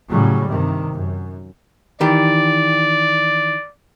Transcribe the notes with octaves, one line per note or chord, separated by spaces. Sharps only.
A2 C#3 F#3 G3
G2 C3 D#3
F#2
D#3 E3 G4 D5